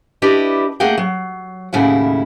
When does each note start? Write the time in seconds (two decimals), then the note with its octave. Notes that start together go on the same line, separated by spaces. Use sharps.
0.22 D4 E4 G4 B4 D5 D#5
0.80 A3 A#3 G#4 F#5 G5
0.98 F#3
1.73 D#2 A2 C#3 E4 F#5